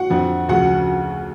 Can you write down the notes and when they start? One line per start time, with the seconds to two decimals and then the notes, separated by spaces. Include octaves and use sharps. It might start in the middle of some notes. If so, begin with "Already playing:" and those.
Already playing: F#4 F#5
0.10 F2 D3 F3
0.49 D2 C#3 F3 F#4 F#5